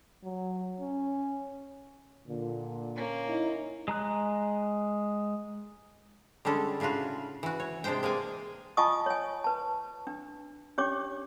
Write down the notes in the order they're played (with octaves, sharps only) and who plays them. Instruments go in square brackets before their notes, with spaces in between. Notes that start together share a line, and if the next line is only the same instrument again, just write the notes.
[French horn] F#3
C#4
[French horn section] A#2 D3
[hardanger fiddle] A#3 C#4
[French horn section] D#4 E4
[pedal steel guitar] G#3 A#5 F#6
[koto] D3 G3 G#3 C#4 A4
A2 C#3 D4 F4 F#4
E3 F#4
C#5
C3 G#3 D4 C5 G5
G#3 A#3 D5 G#5
[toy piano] F4 D#5 G#5 A5 C#6 D#6
C#5 G#5
B4 A5
D4
C#4 D4 G4 C#5 D6